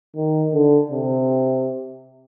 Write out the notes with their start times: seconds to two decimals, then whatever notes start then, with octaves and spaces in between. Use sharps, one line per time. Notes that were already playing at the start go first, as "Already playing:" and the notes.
0.16 D#3
0.54 D3
0.91 C3